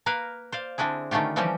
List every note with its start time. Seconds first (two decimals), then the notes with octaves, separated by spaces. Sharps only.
0.06 A#3 A#4 B4 F5
0.52 C5 D5 F5
0.78 D3 C4 D4 E4 G#4
1.11 D3 D#3 A3 C#4 F4 G4
1.36 E3 F3 G3 C4 C#4 G4